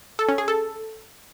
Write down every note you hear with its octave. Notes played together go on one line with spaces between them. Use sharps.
A4
C#4
G#4
A4